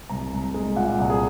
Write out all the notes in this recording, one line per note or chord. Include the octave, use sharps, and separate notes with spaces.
C2 A#5
C2
G#3
A#2 F#5
C2
G#4